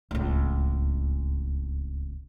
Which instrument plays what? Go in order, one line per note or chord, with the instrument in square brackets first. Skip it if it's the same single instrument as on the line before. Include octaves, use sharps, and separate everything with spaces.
[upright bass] D1 C#2